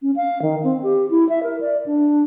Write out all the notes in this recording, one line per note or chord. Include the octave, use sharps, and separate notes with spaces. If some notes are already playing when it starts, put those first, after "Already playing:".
C#4
F5
D#3
C4
G4
E4
E5
A#4
D5
D4